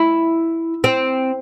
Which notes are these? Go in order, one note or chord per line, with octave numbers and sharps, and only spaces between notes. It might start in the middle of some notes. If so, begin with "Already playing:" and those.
Already playing: E4
C4